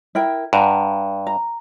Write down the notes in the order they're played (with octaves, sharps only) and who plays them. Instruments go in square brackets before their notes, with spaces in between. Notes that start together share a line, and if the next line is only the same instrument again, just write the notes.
[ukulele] E4 A#4 G5
[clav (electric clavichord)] G2 [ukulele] F#5 A#5
[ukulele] A#5